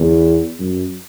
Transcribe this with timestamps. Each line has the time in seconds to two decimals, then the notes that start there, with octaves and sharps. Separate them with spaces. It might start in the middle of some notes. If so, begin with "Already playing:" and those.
Already playing: E2
0.59 F#2